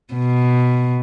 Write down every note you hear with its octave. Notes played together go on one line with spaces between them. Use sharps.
B2